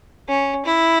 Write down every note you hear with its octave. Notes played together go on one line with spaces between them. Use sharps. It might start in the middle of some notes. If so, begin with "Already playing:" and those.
C#4
E4